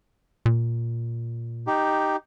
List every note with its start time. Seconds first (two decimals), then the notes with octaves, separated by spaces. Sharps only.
0.46 A#2
1.67 D#4 G4